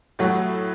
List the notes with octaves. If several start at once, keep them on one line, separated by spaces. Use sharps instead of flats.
A2 F#3 A3